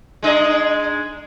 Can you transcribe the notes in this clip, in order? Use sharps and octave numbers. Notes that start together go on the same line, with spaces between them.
G#3 D4 D#5